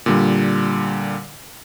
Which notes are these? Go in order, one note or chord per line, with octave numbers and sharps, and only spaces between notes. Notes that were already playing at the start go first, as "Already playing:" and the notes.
A#2 D3 G3